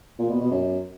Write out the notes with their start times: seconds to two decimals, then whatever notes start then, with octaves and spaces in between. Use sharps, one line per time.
0.19 A#2
0.30 B2
0.40 B2
0.51 F#2